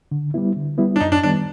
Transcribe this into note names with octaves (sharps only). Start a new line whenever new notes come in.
D3
G3 B3 E4
D3
G3 B3 E4
D4
F#2 D#4
D4
D#3 G3 B3 D4